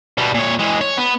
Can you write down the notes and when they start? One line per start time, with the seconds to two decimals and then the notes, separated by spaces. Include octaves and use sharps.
0.18 B2 G3
0.34 A#2 C#5
0.59 E3 G#3
0.81 C#5
0.98 B3